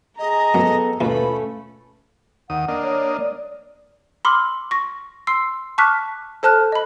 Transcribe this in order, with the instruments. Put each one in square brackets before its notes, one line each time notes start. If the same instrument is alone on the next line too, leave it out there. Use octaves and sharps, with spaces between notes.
[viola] G#4 A#5 [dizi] D#5
[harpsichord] F#2 F#3 [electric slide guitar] B3 A4
[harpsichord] D#2 B2 [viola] A3 C#4 [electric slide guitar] F4 B4 [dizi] B5
[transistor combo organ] D#2 D#6 [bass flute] F#5
[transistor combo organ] A#3 D4 D#5
[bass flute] C#5
D5
[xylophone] B5 C6 D6 E6 F6
C#6 A#6
C6 E6 C7
A5 C#6 D6 F6 F#6 B6
A4 C5 A5 F6 F#6
D#5 B5